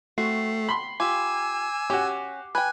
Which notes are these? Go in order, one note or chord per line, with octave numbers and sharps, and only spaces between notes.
A3 C4 F#4 C7
B5 C6
F4 G4 G#5 D6 E6
C#4 F#4 G4
B4 G5 G#5 F#6